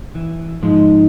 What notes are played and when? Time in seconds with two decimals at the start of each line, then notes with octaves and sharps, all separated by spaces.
0.15 E3
0.62 G#2 F3 G#3 D#4